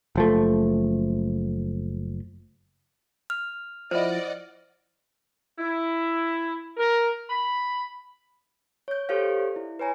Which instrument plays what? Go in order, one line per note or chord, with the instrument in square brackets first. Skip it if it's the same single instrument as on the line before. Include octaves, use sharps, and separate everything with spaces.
[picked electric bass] F#1 F3 A3
[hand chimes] F6
[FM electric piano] F3 E4 [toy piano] C5 [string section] D5 D#5 F#5
[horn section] E4
A#4
B5
[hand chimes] C#5 G6
G4 A4 C5 C#5 F5
D5
E4
B4 C#5 G#5 A#5